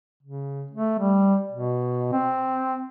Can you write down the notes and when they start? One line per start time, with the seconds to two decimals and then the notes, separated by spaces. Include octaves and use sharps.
0.23 C#3
0.71 A3
0.99 G3
1.52 B2
2.13 C4